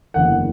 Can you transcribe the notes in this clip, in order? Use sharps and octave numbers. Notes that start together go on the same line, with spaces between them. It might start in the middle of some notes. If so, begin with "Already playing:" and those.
F#1 E2 D3 F#5